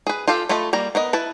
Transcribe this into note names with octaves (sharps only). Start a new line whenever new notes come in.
G#4 B4
F4 G4 A4 F5
A3 F4 A4 D#5 B5
G3 A#3 A#5
B3 A#4 D#5
E4 B4 A5